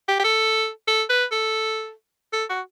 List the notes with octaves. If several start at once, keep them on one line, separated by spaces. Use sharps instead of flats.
G4
G4
A4
A4
B4
A4
A4
F#4